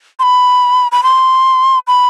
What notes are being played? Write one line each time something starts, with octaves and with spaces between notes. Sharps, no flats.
C6
B5
B5
C6
B5